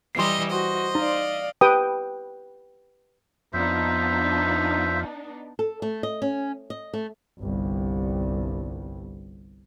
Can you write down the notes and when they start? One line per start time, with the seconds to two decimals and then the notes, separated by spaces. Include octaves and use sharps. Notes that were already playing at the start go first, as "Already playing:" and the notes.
0.15 E3 G3 D#5 C6 C7
0.51 F#4 C5 D#5
0.95 D#4 D5 F5
1.61 G4 B4 G5 D#6
3.53 F2 B3 D4 D#4 F4 C5 E5
5.59 A4
5.82 A3
6.03 D#5
6.22 C#4
6.70 D#5
6.93 A3
7.40 G1 C2